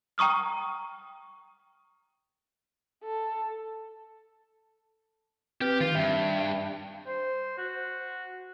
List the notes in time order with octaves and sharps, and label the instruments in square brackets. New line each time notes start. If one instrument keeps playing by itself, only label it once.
[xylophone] G5 A#5 C#6 D#6 F6
[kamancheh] A4
[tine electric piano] C4 B4 F6 [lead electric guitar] G4
[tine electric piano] D#3 [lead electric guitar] F4
[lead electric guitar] G2 [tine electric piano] E5
[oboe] C5
F#4